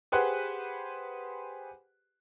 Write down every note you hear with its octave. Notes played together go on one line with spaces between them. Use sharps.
G4 G#4 B4 C5 F#5 F#6